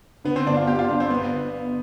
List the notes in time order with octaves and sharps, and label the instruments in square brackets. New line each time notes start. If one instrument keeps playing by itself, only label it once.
[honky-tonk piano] D3 [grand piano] B3
[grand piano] C4
[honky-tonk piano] G1 [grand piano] D4
[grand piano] F4
[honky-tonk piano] G1 [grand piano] G4
[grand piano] F4
[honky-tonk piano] G1 [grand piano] D4
[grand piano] C4
[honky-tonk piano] G1 [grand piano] B3